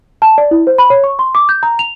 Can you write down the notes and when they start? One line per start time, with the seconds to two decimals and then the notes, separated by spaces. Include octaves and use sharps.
0.22 A5
0.38 D5
0.51 E4
0.67 C5
0.78 B5
0.90 C#5
1.04 C#6
1.19 C6
1.35 D6
1.49 G6
1.63 A#5
1.79 F7